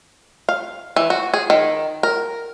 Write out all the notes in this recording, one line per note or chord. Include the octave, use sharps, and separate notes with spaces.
F5
E3
F#4
G#4
D#3
A#4